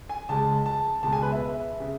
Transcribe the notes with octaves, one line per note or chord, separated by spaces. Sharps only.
G#5
C#2 C#3 G#3 A5
A5
C#2 B2 G#3 A5
G#5
B4
E5
C#3